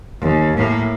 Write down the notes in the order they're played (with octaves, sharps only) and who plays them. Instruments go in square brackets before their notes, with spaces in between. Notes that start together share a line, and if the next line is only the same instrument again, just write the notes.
[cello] D#2
A2 A#3